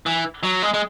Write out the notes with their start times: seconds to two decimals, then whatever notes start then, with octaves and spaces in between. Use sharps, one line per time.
0.06 E3
0.43 F#3
0.62 G#3
0.74 G#3